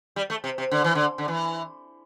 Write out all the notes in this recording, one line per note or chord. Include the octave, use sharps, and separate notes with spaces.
G3
A3
C3
C3
D3
E3
D3
D3
E3